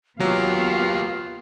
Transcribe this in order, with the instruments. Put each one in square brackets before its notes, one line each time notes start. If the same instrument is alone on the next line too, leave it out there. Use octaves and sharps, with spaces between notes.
[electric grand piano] F#3 [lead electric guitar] A#3 G4 [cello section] B3 F5 [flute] F4